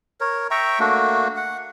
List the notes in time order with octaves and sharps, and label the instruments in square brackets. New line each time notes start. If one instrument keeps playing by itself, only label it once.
[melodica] A#4 C#5
E5 G5 A#5 C#6
A3 A#3 D4 F#4
F#5